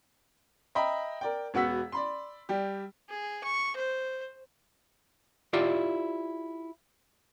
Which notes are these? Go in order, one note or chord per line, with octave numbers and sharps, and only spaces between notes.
D#5 E5 G5 A#5 B5
A#4 D5 G5
E1 B3 F#4 F#5 E6 B6
D5 B5 C6
G3 G4
G#4
C#6
C5
E4 F4 G4 D5